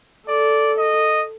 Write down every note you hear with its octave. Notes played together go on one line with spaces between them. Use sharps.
A4 D5
D#5